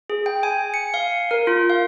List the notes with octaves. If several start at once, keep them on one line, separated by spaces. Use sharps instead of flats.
G#4
G5
G#5
C#7
F5
A#4
F4
F5